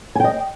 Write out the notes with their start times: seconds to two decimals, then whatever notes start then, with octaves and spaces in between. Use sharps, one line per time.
0.15 G#5
0.20 G5
0.24 D#5